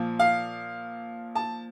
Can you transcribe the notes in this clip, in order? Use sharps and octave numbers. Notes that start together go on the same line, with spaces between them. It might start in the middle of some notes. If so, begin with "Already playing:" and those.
Already playing: A#2 F3
F5
A5